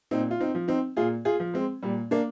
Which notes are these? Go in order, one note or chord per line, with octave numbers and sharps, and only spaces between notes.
A#2 C4 D#4
F4
C4 D#4
F3
C4 D#4
A#2 F4 G#4
F4 G#4
F3
G#3 C4
A#2 G3
A#3 D4